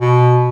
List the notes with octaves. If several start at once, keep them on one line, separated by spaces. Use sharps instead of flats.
B2